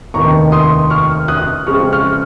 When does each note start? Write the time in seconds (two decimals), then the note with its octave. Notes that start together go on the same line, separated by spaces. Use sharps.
0.14 F1 D#2 D#3 A#5 C#6
0.52 C6 D#6
0.90 C#6 F6
1.28 D#6 F#6
1.67 F2 C#3 F3 G#3 C#6 F6
1.93 C#6 F6